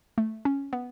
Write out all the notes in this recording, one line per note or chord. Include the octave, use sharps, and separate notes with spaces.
A3
C#4
B3